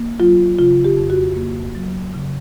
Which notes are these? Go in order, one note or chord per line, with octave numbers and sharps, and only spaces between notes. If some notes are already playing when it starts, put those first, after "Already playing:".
Already playing: A#3
F#3 F4
C#3 F4
G4
F2
F#4
A#3
F#3
C#3